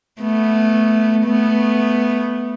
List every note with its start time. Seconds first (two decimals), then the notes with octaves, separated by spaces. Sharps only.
0.22 A3 B3
1.26 A3 B3